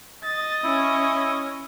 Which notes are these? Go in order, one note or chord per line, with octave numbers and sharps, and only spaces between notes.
D#5 A6
C#4 E4 C#5